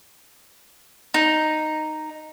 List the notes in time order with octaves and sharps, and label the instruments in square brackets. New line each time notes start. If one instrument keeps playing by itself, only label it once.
[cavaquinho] D#4